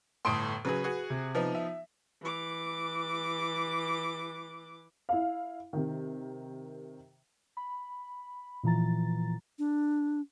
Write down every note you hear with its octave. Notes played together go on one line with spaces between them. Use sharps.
G1 A2 A3 C6 D#6 D7
C#3 F#3 G#4 B4
F#4 G#4
C3
F3 B3 D#4
E5
E3 D6
E4 F5
C3 D#3
B5
A#2 E3 F3 A#5 A6
D4